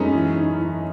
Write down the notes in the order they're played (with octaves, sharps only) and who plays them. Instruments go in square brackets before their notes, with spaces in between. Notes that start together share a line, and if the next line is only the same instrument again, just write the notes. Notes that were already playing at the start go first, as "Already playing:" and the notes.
Already playing: [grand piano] F#2 G#3 [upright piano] A3 B3 C#4 D#4
[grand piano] E3
D#4
E3